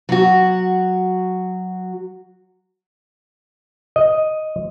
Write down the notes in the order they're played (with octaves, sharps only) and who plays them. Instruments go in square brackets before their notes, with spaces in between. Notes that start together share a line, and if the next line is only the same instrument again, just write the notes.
[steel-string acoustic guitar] F#3 F#4
[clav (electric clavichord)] D#5